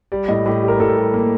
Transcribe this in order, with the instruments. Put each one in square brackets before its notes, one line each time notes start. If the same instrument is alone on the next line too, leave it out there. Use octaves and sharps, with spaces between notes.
[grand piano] G3 D5
A2 D#5
A2 G4
G3
A#4
A2 A4
G3
A#3